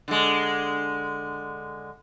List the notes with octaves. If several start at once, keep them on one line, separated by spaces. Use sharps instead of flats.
D3 G#3